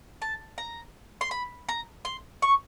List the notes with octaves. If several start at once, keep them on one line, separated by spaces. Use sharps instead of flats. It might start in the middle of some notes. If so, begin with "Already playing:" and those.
A5
A#5
C6
B5
A#5
C6
C#6